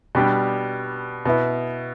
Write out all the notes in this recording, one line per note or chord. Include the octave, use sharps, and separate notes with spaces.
B2 G3 D4 G4
B2 B3 E4